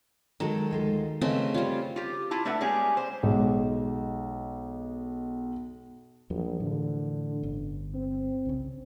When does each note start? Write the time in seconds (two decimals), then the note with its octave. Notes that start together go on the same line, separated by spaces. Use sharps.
0.40 D#3 F#3 G#3 A4
0.71 D2 G#3 F4
1.21 C#3 A3 C4 A#4 B4 D#5
1.54 G3 F4 C#5
1.96 F4 G4
2.31 E4 F4 A5
2.45 A3 D4 B4 E5 F#5
2.61 G3 G#3 B3 C#4 G4 G#4
2.97 C5
3.23 B1 G#3
6.30 A#1 E2 F3 F#3
6.60 A2 D3 E3
7.43 G1 C#4
7.94 C4
8.45 C2 C#3